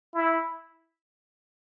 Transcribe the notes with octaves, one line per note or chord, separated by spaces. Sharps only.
E4